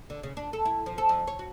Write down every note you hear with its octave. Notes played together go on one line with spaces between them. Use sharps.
D3
C#3
D4
A4
E4
F3
A4
F2
C#5
F#4